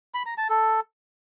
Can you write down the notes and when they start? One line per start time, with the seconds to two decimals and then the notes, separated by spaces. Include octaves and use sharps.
0.14 B5
0.26 A#5
0.38 A5
0.49 A4